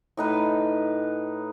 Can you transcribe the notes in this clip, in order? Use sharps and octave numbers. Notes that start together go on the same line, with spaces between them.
A2 D#4 B4